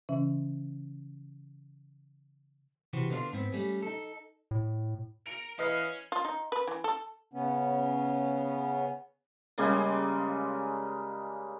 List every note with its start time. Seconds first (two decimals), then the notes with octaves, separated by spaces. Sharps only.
0.09 C#3 E3 C#4 E5
2.93 C3 E3 C4 F#4
3.10 D3 B3 D4 E4 F4
3.33 G#2 B3 C4
3.53 G3 A3 C#4
3.82 D#4 A4
4.51 A2
5.26 A#4 C#7 D7 F7
5.59 E3 C#4 B4 D#5 F5
6.12 F4
6.25 D#4
6.52 B4
6.67 E3
6.84 A4
7.34 C#3 B3 C#4
9.58 C#3 G3 G#3 A#3